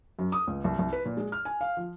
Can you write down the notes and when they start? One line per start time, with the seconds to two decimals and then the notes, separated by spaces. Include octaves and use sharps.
0.19 F#2
0.32 D#6
0.47 C#2
0.64 C2
0.79 C2
0.93 B4
1.05 A#2
1.17 G#3
1.32 F6
1.45 G#5
1.61 F5
1.77 F3